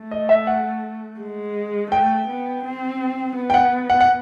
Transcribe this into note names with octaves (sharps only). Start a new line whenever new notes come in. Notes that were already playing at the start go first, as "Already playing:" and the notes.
Already playing: A3
D#5
E5
F#5
G#3
A3 G5
B3
C4
B3
G5
F#5
F#5
F#5